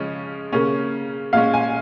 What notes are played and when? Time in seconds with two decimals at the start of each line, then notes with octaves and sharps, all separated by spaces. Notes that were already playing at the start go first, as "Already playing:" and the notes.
Already playing: C#3 F3 G#3 C#4
0.53 C#3 A#3 C#4
1.33 A#2 G#3 C#4 F5
1.54 G#5